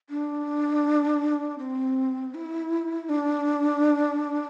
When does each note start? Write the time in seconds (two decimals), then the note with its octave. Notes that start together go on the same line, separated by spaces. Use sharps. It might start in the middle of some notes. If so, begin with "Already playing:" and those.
0.10 D4
1.59 C4
2.34 E4
3.09 D4